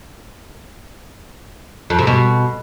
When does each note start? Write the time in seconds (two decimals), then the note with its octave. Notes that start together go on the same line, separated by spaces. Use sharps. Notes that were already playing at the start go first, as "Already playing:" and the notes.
1.90 F2
1.99 C3
2.07 B2